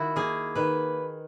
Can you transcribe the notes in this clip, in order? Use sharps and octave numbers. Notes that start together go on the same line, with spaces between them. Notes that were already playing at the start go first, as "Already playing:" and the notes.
Already playing: D#3 E4 F#4
A#3 G#4
D#3 B4